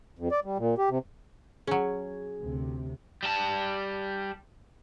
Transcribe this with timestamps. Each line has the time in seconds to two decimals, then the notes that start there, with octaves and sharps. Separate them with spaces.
0.19 F2
0.31 D5
0.45 G3
0.58 A#2
0.78 G4
0.90 C3
1.67 F#3 C#4 G#4
2.41 D2 C3
3.23 G3 A5